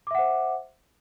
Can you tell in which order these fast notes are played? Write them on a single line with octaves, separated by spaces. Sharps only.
D6 E5 F#5 C5